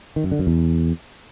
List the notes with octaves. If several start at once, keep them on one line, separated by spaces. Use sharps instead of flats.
D#3
F#2
D3
F#2
E2